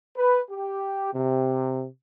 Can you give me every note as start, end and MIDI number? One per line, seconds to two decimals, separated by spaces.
0.17 0.40 71
0.50 1.11 67
1.14 1.87 48